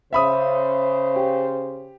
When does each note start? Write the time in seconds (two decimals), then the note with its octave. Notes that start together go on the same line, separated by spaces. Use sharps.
0.13 C#3 C5 E5 B5 D#6
1.16 G4